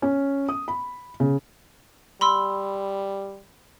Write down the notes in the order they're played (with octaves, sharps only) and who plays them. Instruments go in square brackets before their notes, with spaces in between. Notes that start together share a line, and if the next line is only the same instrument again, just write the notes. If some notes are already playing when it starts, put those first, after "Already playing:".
[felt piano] C#4
D#6
B5
C#3
[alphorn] G3 [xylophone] B5 C6 E6